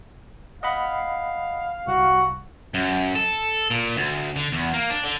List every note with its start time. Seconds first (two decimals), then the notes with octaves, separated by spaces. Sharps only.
0.63 D#5 F5 F#5 B5
1.87 C2 F#4
2.74 F#2
3.15 A4
3.71 A#2
3.96 D2
4.36 D3
4.52 E2
4.74 A#3
4.90 D4
5.04 D3